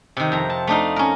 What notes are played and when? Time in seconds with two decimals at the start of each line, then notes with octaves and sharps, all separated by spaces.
0.17 C3 D#3
0.32 F2 A#5
0.50 A5
0.67 A3 D4 D#4 F5
0.96 C#4 A#4